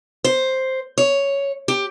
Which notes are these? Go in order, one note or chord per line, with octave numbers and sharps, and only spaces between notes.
C5
C#5
G4